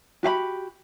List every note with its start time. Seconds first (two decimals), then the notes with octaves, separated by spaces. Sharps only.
0.23 F#4 G4 F5 B5